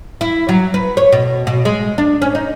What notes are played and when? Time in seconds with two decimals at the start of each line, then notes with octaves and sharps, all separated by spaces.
0.21 E4
0.49 F#3
0.74 B4
0.97 C#5
1.12 B2
1.47 B2
1.65 G#3
1.98 D4
2.22 C#4
2.35 D#4